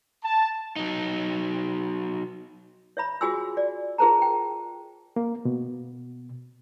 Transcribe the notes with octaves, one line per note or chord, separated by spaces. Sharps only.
A5
F#3 D#4
C#5 E5 B5
F4 F#4 G#4 G#5 C6 E6
D5
F4 G#4 A#4 C5 A5 A#5
G5
A#3
B2